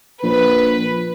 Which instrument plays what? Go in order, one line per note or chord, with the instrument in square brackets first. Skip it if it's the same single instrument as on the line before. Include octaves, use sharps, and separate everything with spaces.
[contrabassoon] A#1 [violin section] B4